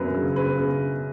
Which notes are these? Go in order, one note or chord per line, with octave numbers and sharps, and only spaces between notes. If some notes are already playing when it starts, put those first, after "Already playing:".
Already playing: F#2 F#3 B4
C#3
C#3 B4
C#3